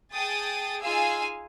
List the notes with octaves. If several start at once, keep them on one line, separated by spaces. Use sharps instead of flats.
G#4 G5 A5 D#6 A6
D#4 F4 G#4 F5 G#5 E6